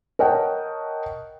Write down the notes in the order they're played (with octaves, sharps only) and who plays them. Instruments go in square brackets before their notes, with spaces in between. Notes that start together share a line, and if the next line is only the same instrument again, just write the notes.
[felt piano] A#4 C#5 D#5 F#5 G5 A5